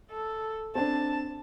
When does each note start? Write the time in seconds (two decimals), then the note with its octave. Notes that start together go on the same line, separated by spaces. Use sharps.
0.11 A4
0.75 C4 D4 A5